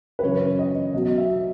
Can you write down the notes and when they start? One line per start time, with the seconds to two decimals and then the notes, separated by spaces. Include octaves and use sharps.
0.19 B4
0.23 F#2 C#3 E3 C#5
0.59 D#5
0.94 B1 B2 F#3 D#5
1.17 E5